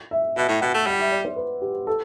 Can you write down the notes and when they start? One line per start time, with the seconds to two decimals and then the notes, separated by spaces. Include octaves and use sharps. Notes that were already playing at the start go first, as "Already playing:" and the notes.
0.11 E5
0.37 B2 E5
0.49 A2
0.61 B2 F#5
0.74 A3
0.86 G3 F#5
0.99 E5
1.12 D5
1.25 C5
1.36 B4
1.62 G4
1.87 A4